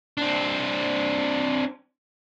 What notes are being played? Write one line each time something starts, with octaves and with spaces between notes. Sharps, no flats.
C4 D4